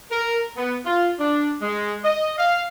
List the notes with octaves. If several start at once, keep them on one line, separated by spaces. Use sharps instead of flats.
A#4
B3
F4
D4
G#3
D#5
F5